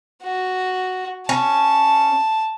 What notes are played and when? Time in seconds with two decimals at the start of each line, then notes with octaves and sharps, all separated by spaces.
0.23 F#4
1.29 C#4 A5